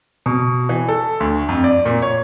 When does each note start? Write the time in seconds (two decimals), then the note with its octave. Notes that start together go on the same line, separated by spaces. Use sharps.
0.26 B2
0.69 E3
0.88 A4
1.20 D2
1.49 F2
1.64 D5
1.86 A#2
2.02 C#5